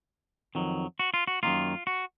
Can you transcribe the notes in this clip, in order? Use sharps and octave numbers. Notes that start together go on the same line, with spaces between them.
F2 D#3 F#3
F#4
F4
F#4
F#2 D#3 A#3 F4
F#4